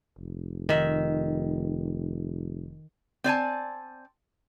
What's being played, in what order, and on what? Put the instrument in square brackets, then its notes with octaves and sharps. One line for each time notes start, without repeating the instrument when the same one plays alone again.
[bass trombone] F1
[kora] D#3 E5
[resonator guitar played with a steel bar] C4 D5 G#5 A5